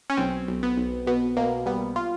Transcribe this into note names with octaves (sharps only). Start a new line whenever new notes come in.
C#4
B1 C4
B1
B3
B1
B2 B3
B2 A#3
G3 B3
F4